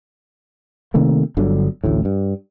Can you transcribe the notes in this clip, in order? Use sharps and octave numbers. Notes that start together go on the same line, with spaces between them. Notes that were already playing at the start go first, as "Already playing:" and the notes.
C3 D#3 A3 A#3
G1 D3 F#3
A1 D2 A2
G2